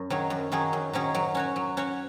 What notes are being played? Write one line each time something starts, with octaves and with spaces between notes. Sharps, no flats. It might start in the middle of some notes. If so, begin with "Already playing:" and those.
Already playing: F#2
D#3 F#3 C#4 G#4
F#2
D#3 F#3 C#4 G#4
F#2
D#3 F#3 C#4 G#4
F#3
C#4 F#4 C#5
F#3
C#4 F#4 C#5